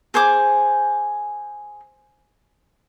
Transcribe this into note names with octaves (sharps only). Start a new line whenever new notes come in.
G#4 C5 G#5 D6